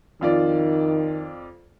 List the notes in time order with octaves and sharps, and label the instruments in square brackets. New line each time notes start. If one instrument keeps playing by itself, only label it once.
[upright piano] F2 F4 D5 [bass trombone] D#3